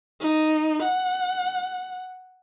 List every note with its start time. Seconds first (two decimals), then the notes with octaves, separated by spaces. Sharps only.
0.20 D#4
0.82 F#5